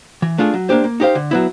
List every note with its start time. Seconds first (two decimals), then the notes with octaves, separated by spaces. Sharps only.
0.22 E3
0.38 A3 D4 F4 G#4
0.54 F#3
0.69 A#3 D4 G4 C5
0.84 A#3
1.00 D#4 G4 C5 F5
1.15 D3
1.31 F#3 B3 E4